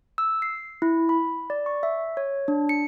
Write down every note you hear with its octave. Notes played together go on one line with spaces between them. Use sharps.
E6
C7
E4
B5
D5
C#6
E5
C#5
D4
C#7